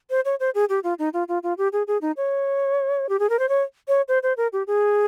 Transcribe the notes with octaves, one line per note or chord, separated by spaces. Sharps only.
C5
C#5
C5
G#4
G4
F4
D#4
F4
F4
F4
G4
G#4
G#4
D#4
C#5
G4
G#4
A#4
C5
C#5
C#5
C5
C5
A#4
G4
G#4